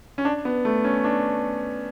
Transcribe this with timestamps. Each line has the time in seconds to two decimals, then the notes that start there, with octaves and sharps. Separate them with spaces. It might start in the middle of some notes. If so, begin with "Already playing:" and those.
0.18 C#4
0.25 D4
0.45 B3
0.65 A3
0.84 C#4
1.04 D4